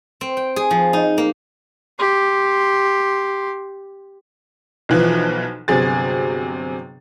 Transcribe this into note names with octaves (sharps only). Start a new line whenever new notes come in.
C4
G5
G#4
F3
D#4
A#3
G4 C6
B1 E3 F3
G1 C3 F#3 G#4 A6